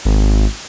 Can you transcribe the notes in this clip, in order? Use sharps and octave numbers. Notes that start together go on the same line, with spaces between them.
G#1